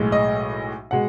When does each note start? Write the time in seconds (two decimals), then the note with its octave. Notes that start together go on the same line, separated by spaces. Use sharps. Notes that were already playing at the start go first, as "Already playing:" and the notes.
Already playing: B1 A2 G#3
0.12 D#5
0.91 B2 G#3 F#5